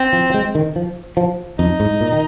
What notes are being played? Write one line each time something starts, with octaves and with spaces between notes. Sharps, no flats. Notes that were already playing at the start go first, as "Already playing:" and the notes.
Already playing: C4
F3
F3
G#3
D#3
F3
F3
F2 D#4
G#2
A#2
D#3